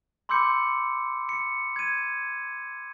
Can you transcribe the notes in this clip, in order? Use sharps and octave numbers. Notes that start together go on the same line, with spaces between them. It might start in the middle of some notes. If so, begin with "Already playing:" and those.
B5 C6 D6 E6 G6 C#7
C#7
G#6 D#7